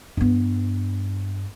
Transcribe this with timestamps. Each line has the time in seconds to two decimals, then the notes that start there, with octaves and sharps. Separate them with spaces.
0.17 G2 B3